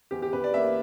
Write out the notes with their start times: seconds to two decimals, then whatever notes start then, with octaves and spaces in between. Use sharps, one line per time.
0.11 E2 G4
0.22 G4
0.33 E2 B4
0.44 D5
0.54 A#3 E5